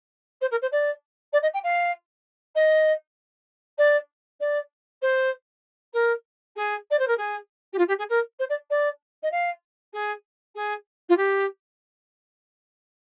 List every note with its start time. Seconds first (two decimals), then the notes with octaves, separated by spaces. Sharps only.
0.41 C5
0.51 A#4
0.61 C5
0.71 D5
1.33 D5
1.42 D#5
1.53 G5
1.63 F5
2.55 D#5
3.78 D5
4.40 D5
5.02 C5
5.93 A#4
6.56 G#4
6.90 D5
6.99 C5
7.07 A#4
7.17 G#4
7.73 G4
7.78 F4
7.88 G4
7.98 G#4
8.09 A#4
8.39 C5
8.49 D5
8.70 D5
9.23 D#5
9.31 F5
9.93 G#4
10.55 G#4
11.09 F4
11.17 G4